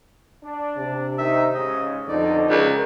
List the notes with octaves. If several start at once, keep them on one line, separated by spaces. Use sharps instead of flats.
D4
C3
D#3 D#4 E5
G#2 C#3 D#5
F2 B2 D3 D#4 D5
C#2 A#4 D5